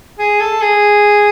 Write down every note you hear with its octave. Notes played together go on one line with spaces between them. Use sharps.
G#4
A4
G#4